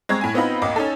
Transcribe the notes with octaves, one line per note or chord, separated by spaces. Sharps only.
G#3 C4 A#5 C#6 G#6
A2 G#5
B3 C4 D#4 F4 D#5 B5
A1 D#2 D#5 D6
C#4 D#4 A4